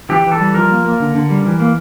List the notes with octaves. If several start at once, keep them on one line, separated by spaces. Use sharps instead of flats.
E3 G4
E3
A4
G3
F3 A#4
A#3
A#3
D3
D3
G3
E3
A#3